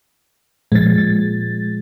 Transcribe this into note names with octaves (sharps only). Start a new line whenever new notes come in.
A#2 F3 G#3 A6